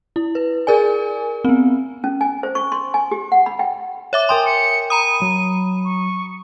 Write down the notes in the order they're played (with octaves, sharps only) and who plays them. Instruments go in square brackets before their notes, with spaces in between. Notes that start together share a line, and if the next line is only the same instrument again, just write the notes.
[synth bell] E4
B4
G#4 A#4 D5 G#5
B3 C4
[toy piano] C#4
G#5
C5
C#6
C6
G#5
G4
F#5
B5
G5
[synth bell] C#5 E5 D6
[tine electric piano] A#4 G5 G#5 [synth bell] C6 [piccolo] D#6
[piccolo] C#7
[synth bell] A#5 B5 D#6 [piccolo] D#7
[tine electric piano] F#3
[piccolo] C#6